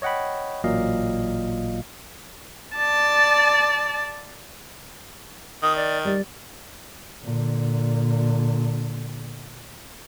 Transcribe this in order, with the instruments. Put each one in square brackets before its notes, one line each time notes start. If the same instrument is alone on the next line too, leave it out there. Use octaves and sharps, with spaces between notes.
[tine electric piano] C#5 D#5 F#5 G5 B5
A1 A#2 F#3 D#5 F5
[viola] D5 A5
[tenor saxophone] D#3 [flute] D#6
[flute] D5
[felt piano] G3 [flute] D5
[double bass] A#2 D3